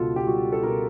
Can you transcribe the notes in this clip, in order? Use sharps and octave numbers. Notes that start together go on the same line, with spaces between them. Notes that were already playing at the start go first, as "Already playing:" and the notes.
Already playing: C#2 B2 F4 A4
G4
G3 F#4
A4
B2 A#4